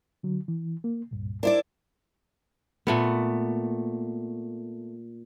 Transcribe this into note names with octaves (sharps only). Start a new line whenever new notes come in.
D3 F#3
E3
A#3
C#2 G2 A#2
D4 E4 A#4 C5 D5
A#2 A3 B3